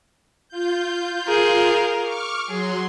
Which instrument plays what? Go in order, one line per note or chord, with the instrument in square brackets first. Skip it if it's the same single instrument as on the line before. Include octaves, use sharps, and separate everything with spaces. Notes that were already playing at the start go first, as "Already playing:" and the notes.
[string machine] F4 G6
[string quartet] G#4 A#4 F5
[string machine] C#6 D6 F6
[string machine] F#3 C6 [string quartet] G#4